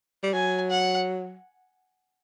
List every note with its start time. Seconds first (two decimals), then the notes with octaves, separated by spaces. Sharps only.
0.23 G3
0.34 F#3 G#5
0.71 F#5